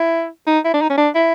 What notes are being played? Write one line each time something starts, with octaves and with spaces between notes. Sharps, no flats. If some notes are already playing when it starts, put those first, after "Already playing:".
Already playing: E4
D#4
E4
D4
D#4
C#4
D4
E4